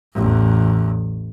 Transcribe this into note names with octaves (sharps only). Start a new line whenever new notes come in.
A1 E2